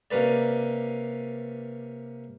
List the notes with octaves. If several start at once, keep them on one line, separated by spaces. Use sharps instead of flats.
C3 A#3 C#4 B4 D5